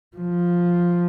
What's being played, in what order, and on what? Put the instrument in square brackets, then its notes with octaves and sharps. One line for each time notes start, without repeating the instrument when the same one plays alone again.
[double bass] F3